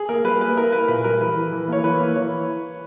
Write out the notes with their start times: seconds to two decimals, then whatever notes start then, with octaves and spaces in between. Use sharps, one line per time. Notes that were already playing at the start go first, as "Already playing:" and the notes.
Already playing: G#4
0.09 A#3 A#4
0.25 G3 B4
0.41 A#3 B4
0.57 E4 A#4
0.72 A#3 B4
0.88 A#2 B4
1.04 G3 A#4
1.21 E3 B4
1.36 E3
1.52 E3
1.68 A#3 C#5
1.84 E3 B4
2.00 A#3
2.16 E3 C#5